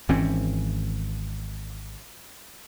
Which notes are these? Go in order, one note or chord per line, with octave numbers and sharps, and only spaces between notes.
G#1 E3 C4 C#4